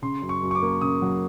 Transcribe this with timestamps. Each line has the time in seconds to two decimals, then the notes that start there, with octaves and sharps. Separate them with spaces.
0.02 C#3 C6
0.22 F#2
0.29 C#6
0.43 F#2
0.51 C#6
0.55 D6
0.62 A#3
0.81 C#3 D#6
1.02 F#3